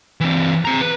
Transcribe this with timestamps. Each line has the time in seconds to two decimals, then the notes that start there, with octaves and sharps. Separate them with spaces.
0.21 E3 C4
0.65 C4 A#5
0.81 B4